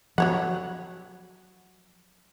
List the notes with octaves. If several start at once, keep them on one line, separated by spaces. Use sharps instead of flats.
F3 F#3 C#5 F#5